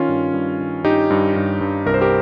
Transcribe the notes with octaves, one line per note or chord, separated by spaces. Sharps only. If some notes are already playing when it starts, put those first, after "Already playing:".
Already playing: D#3 C#4 F4
G2
G2
D#3
G2 D#4 G4
G2
G2
G2
C2 A#4
C5
G4 A#4